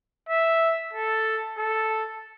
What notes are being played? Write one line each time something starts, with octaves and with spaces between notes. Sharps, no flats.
E5
A4
A4